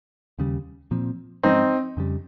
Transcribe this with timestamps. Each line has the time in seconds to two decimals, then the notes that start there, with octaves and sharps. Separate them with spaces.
0.39 D#2 C#3 G3
0.91 A#2 F3 C4
1.43 G#2 F3 G#3 C4 C#4 D#4
1.97 F2 C#3 G3